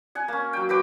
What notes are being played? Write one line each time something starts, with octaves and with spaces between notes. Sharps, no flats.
F#5 G#5
A#3 C#4
F#3 G5
F#4 B4 G5 D6